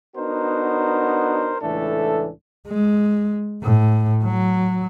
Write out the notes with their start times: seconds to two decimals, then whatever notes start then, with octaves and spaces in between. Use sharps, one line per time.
0.16 B3 D4 D#4 F#4 A#4 C5
1.61 C#2 A2 E3 A3 D4 A4
2.68 G#3
3.63 A2
4.24 F#3